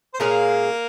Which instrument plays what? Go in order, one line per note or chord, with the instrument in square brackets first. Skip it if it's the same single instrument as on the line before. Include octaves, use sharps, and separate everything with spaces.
[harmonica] C5
[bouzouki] A#2 G#3 C#4 G#4 [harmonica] A#3 A#4